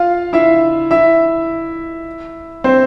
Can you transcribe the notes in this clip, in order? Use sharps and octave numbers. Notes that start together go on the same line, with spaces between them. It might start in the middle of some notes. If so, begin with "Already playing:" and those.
Already playing: F4 F5
E4 E5
E4 E5
C4 C5